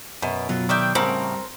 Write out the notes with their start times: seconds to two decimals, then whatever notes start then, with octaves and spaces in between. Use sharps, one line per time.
0.22 F#2 B2
0.49 B2 F#3 F4
0.69 D#3 D5 E5 G5
0.95 A2 C#3 G3 C4 A#4 F#5